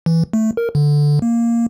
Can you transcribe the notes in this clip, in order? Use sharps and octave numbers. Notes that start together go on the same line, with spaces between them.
E3
A3
A#4
D3
A#3